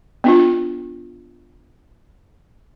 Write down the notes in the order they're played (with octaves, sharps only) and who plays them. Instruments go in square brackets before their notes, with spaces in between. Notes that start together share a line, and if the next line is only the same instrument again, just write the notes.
[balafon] B3 D4 F4